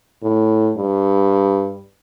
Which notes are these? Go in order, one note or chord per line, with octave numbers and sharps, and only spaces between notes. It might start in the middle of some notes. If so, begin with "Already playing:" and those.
A2
G2